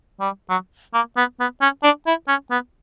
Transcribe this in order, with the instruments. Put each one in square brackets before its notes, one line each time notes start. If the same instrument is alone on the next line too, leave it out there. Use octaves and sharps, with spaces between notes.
[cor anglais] G3
F#3
A#3
B3
B3
C#4
D4
E4
C#4
B3